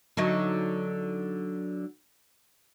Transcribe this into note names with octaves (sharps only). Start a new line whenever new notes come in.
D3 F#3 D#4